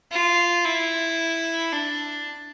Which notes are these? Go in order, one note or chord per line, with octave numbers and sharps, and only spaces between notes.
F4
E4
D4